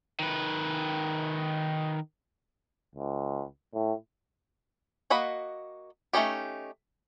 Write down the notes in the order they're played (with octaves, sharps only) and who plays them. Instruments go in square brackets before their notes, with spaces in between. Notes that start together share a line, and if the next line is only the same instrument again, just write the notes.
[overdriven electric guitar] D#3 B4
[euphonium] C#2
A2
[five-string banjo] A#3 F#4 D#5 B5
A3 C#4 D#4 G4